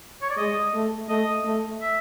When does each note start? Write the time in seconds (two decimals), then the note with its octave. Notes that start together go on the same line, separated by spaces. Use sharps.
0.22 C#5
0.30 D5
0.37 G#3 D#5
0.74 A3
1.09 A3 D#5
1.45 A3
1.82 E5